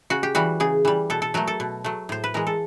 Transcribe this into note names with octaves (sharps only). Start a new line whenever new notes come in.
C#3 F#4
G4
E3 G3 F#4
C#3 G#4
E3 G3
B2 A4
A4
F#3 A3 A#4
A4
B2
F#3 A3
A2 C5
B4
E3 G#3 A#4
A4